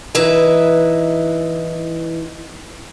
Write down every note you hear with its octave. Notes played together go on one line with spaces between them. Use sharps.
E3 D#4 E4 B4 E5